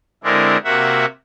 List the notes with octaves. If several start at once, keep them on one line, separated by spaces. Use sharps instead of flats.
D3 G#3 C4 D4 E4 A#4
C3 A#3 F#4 E5 F#5